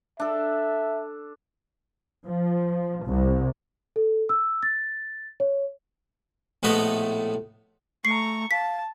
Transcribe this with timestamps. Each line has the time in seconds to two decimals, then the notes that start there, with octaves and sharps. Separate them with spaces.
0.20 D4 A4 E5
2.26 F3
3.05 C2
3.96 A4
4.29 E6
4.63 A6
5.40 C#5
6.63 A#1 A2 A3 B3 B4 D#5
8.05 A3 A#5 C#6 C7
8.51 F5 A5 B6